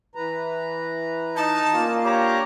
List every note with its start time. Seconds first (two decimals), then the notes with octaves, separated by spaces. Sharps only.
0.15 E3 B4 A#5
1.36 D#4 A5
1.74 A#3 C#4 F4 D5
2.04 D4 G4 C#5 A#5 D6